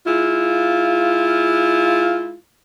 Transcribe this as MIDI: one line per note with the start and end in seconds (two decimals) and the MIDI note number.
0.06 2.36 56
0.06 2.36 64
0.06 2.36 65